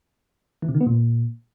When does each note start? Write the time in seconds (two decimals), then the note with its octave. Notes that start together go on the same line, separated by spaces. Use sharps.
0.62 E3
0.68 C3
0.75 D#3
0.81 B3
0.87 A#2